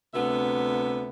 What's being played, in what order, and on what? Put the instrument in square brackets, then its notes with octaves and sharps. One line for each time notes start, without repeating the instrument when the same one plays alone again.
[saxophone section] D2 C3 B3 E5